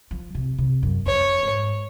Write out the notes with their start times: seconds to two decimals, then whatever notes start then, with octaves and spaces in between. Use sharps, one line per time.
0.11 F3
0.35 C3
0.58 C3
0.83 F#2
1.06 F2 C#5
1.43 G#2